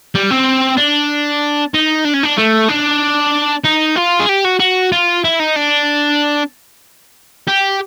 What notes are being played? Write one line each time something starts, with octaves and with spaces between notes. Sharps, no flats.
G3
C4
D4
D#4
D4
C#4
D4
A3
D4
D#4
F4
G#4
G4
F#4
F#4
F4
E4
D#4
D4
G4